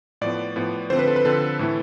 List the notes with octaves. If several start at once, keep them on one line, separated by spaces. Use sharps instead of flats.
A2 F3 B3 D5
A2 F3 B3
D3 F3 C4 C5
B4
A4
B4
D3 F3 C4 A4
A2 E3 A3 E4